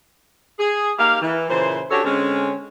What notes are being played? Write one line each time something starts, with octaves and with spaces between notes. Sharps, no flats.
G#4
A#3 D#4 G4 F5
E3
A#2 C#3 E3 C5
C#4 D4 F#4 G4 A4 C#5
D3 G#3 C4 C#4